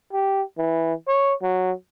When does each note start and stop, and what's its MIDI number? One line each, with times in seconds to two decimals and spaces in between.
0.13 0.42 67
0.58 0.93 52
1.08 1.34 73
1.42 1.72 54